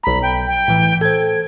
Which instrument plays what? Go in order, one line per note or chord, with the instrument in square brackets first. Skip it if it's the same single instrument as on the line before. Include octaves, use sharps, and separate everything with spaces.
[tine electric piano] B1 A#5 [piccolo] B5
[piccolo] G5
G5
[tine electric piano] A2 E3
[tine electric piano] A4 C5 [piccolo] G#6